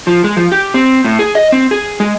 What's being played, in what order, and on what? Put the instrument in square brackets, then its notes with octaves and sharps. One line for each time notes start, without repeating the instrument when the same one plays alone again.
[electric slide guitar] F3
G#3
F3
G4
C4
A2
G#4
D#5
C4
G#4
G#3